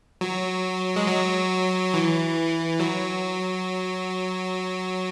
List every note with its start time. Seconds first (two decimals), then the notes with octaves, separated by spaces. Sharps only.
0.21 F#3
0.96 G#3
1.07 F#3
1.94 E3
2.80 F#3